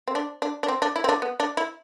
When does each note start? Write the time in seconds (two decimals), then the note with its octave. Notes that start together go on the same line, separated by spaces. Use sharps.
0.08 C4
0.15 D4
0.42 D4
0.63 D4
0.68 C4
0.82 D4
0.96 E4
1.04 C4
1.09 D4
1.22 B3
1.40 D4
1.57 E4